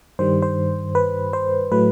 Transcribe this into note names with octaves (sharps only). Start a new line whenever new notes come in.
G2 D#3 G3 C5
C5
B4
C5
A2 F#3 A3 B4